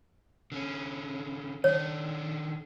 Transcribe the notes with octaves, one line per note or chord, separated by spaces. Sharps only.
D3 C#4
D#3 D4 C#5